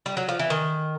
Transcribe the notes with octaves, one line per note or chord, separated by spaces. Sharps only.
G3
F#3
F3
E3
D#3